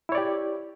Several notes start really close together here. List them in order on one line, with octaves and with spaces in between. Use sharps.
E4 C#5 D5 G4